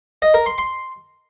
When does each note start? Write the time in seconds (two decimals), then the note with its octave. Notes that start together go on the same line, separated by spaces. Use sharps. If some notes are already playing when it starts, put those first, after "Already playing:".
0.22 D#5
0.34 A#4
0.46 C6
0.58 C6